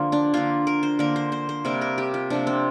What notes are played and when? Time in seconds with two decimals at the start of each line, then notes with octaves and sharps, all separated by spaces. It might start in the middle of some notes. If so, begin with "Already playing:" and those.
Already playing: D3 F3 A#3 F4
0.12 D4
0.34 D3 A#3 F4
0.67 A#4
0.83 C5
0.99 D3 A#3 A#4
1.16 C5
1.32 C5
1.49 C5
1.65 C3 G3 A#3 A#4
1.81 A#4
1.98 G4
2.14 F4
2.30 C3 F3 A#3 D4
2.47 C4